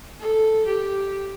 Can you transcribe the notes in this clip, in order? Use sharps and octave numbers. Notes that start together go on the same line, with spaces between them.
A4
G4